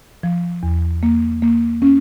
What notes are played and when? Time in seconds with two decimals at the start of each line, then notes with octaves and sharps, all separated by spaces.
0.23 F3
0.63 E2
1.03 A#3
1.42 A#3
1.82 C#4